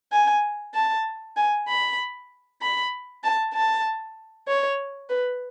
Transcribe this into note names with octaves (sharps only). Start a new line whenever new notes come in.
G#5
A5
G#5
B5
B5
A5
A5
C#5
B4